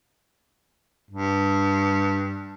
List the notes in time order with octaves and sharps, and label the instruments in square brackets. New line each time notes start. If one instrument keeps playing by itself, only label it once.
[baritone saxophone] G2